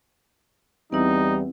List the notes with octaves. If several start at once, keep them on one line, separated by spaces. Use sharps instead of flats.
E2 G3 C4 D#4 E4